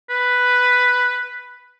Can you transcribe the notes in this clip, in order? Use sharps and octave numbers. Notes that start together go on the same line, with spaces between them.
B4